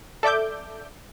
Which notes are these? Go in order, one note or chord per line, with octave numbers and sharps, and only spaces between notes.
A4 D5 E5 D6 G6